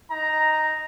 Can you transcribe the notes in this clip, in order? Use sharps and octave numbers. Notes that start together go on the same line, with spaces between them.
D#4 A#5